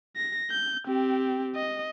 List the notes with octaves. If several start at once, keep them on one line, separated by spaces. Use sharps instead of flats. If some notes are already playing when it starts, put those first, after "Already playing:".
A#6
G6
C4 G4
D#5